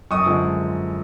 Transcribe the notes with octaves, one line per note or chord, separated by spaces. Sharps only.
F#2 C#6 D#6
D3 F3 G#3